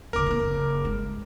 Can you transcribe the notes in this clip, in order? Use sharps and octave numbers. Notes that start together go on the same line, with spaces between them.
D#2 D3 A#4 D6
E3 A#3
F#1
G2 G#3